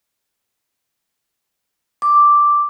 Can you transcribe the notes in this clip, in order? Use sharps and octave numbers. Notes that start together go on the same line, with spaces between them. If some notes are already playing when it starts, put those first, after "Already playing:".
D6